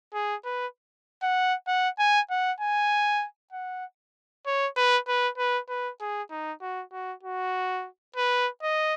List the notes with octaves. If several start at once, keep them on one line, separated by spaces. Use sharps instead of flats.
G#4
B4
F#5
F#5
G#5
F#5
G#5
F#5
C#5
B4
B4
B4
B4
G#4
D#4
F#4
F#4
F#4
B4
D#5